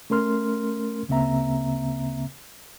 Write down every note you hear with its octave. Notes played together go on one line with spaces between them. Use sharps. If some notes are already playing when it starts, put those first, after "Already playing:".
A3 C#4 A#4 C6 F6
D2 C#3 A#3 C4 E5 A#5